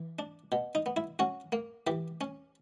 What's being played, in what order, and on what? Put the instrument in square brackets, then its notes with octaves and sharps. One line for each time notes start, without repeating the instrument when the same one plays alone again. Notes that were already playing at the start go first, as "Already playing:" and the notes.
Already playing: [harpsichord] E3
D4
B2
D#4
B3
E4
C#4 F#4
A#3
E3 G4
C#4